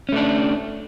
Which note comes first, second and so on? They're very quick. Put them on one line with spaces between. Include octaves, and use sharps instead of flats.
C#4 A3 D4